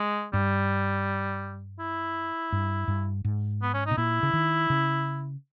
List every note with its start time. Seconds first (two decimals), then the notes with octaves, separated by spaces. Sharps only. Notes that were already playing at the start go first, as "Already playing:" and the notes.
Already playing: G#3
0.33 G2 G3
1.79 E4
2.52 G2
2.88 G2
3.25 G#2
3.63 B3
3.74 C#4
3.86 B2 D#4
3.97 A#2 E4
4.23 C#3
4.33 D#3
4.70 C#3